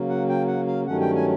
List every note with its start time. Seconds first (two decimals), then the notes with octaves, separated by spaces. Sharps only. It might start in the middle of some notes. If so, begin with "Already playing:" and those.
Already playing: C#3 F#3 A#3
0.09 F#5
0.29 G5
0.48 F#5
0.67 F5
0.86 G2 D#3 F#3 A3 C#4 F#5
1.01 G5
1.15 G#5